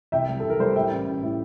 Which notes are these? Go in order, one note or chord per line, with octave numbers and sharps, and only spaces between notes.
C2 E5 G5
G3
C2 A4
A#4
G3 A4 C5
A2 E5 G5
A1
A1
A2